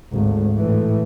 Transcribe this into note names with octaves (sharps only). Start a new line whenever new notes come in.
G#1 D2
A2 E3